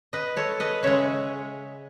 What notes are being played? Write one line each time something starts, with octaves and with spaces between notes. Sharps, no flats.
B4 D#5
A4 C#5
B4 D#5
C#3 G#3 C#5 E5